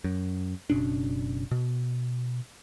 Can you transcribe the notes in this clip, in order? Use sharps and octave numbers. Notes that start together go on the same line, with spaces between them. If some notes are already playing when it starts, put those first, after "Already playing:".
F#2
F#1 B2 C#4 D4
B2